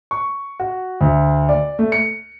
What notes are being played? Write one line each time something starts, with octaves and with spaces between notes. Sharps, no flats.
C#6
F#4
D2
D5
A3
C#7